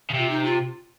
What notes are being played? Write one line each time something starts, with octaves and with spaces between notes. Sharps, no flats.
C#3
C3 F4
D#4
F4